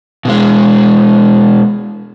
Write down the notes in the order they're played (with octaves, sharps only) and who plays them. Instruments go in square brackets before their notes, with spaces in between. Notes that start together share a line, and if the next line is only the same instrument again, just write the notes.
[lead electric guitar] B2 G#3